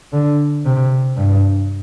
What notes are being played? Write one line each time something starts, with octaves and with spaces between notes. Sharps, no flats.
D3
C3
G2